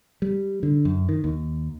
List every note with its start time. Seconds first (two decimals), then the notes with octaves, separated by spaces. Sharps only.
0.22 G3
0.63 D3
0.85 F#2
1.09 D#3
1.24 D#2